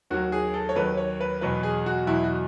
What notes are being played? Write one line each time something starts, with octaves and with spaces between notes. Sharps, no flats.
D#2 D#3 F#3 F#4
G#4
A4
C#5
D#2 D#3 F#3 B4
C#5
B4
E2 B2 F#3 B4
G#4
F#4
E2 B2 F#3 E4
F#4